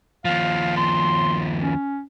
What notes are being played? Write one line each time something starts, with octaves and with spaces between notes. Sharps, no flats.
D#2 F3 F5
C6
C#4